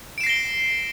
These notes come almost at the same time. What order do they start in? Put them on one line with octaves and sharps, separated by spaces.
D7 E7 C7 A#6 G7